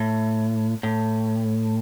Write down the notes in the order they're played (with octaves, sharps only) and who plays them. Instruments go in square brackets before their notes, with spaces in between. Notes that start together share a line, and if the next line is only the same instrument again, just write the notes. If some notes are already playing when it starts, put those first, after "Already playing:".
Already playing: [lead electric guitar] A2
A2